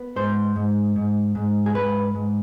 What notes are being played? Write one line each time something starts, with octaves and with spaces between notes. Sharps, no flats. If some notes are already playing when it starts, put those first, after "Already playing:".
Already playing: B3
G#2 C5
G#2
G#2
G#2
G#4
G#2 B4
G#2